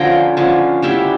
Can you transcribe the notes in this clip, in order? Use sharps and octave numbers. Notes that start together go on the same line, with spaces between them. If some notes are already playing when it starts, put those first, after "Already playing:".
Already playing: D3 F3 C#4 G5 A#5
D3 F3 C#4
D3 G3 C#4 E4 E5 G5